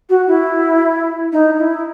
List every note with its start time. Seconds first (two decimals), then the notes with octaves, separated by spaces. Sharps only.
0.09 F#4
0.27 E4
1.32 D#4
1.58 E4